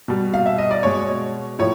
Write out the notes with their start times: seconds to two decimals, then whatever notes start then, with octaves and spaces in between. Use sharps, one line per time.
0.08 B2 G3
0.34 F5
0.46 E5
0.58 D#5
0.71 D5
0.83 B2 G#3 C#5
1.59 A2 F3 C#5